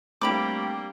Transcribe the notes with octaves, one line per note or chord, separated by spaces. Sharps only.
G3 A3 A#3 C4 D4 G4 B5 D6